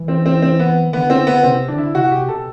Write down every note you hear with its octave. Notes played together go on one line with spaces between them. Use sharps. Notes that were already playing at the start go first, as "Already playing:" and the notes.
Already playing: E3
C4
C4
C4
B3
E3
D3 B3
C4
B3
C3 C4
D3 D4
E4
C3 F#4
C3 G4
B2 A4